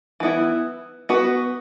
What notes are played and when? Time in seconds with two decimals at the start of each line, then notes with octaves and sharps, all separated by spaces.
0.20 E3 B3 E4
1.09 B3 F#4 B4